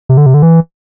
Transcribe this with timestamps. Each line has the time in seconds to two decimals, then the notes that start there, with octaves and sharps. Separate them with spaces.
0.09 C3
0.17 D3
0.26 C3
0.34 D3
0.42 E3